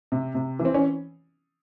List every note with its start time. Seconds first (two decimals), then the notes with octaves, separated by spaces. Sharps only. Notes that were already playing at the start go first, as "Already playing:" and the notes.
0.12 C3
0.35 C3
0.59 E3
0.65 C4
0.74 C#4